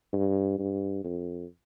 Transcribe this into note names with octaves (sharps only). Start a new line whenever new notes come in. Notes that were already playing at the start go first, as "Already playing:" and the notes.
G2
G2
F2